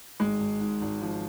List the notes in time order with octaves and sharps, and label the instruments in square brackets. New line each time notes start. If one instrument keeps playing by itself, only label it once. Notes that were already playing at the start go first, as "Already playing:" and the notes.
[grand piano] G#1 [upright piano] G#3
[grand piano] G#1
G#2
G#1
F3